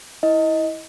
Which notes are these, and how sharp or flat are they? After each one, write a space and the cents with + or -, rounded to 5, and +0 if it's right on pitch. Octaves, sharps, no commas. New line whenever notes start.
E4 -20 D#5 +15